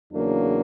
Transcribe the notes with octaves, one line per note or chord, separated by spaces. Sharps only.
E2 C#3 F#3 A#3 D4